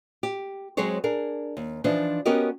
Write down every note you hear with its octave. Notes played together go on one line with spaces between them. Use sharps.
G4
F#3 G#3 C4 G#4 C5 C#5
D4 G#4 A#4
D#2
E3 F3 D4 D#4 C5
B3 C#4 F#4 G4 A#4 D#5